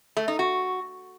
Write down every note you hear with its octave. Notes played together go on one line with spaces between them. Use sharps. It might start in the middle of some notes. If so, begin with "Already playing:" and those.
A3
D#4
F#4